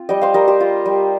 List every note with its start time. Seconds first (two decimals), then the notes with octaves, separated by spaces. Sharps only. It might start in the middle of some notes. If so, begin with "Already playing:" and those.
Already playing: C4 F4
0.09 G3 D#5 G5
0.21 C5 F5
0.34 G3 A#4 D#5
0.48 G4 C5
0.60 F4
0.86 G3